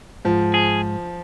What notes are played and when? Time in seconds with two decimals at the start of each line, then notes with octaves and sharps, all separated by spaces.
0.25 G#2 F3
0.54 G#4